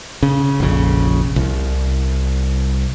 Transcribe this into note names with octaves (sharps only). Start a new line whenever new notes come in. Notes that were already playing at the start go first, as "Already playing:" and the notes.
C#3
F1 A#1 C#3
C2